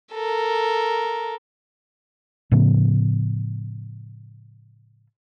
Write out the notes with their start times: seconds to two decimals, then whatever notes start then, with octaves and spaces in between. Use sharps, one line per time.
0.14 A4 A#4
2.51 A2 C#3 F3 B3